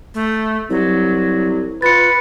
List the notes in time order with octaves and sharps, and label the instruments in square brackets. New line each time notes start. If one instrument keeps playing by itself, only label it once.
[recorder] A3
[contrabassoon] C2 [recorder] F#3
[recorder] F4 [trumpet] B4 [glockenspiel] A6 C#7